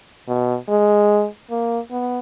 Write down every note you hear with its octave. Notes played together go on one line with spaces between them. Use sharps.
B2
G#3
A#3
B3